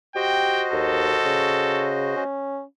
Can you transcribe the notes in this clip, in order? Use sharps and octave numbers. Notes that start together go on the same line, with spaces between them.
F#4 G4 C5 D#5 G5
D#2 A4
C#3
C#4